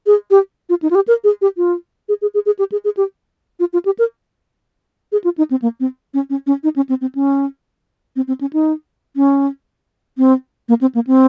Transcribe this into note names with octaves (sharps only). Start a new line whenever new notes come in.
G#4
G4
F4
D#4
F4
G4
A#4
G#4
G4
F4
G#4
G#4
G#4
G#4
G4
G#4
G#4
G4
F4
F4
G4
A#4
G#4
F4
D#4
C4
A#3
C4
C#4
C#4
C#4
D#4
C#4
C4
C4
C#4
C4
C4
C#4
D#4
C#4
C4
A#3
C4
A#3
C4